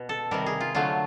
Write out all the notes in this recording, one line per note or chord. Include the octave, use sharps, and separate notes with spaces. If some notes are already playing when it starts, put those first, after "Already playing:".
Already playing: B2
A4
C3 D#3 G3 A#4
G#4
F4
D3 F#3 A3 F4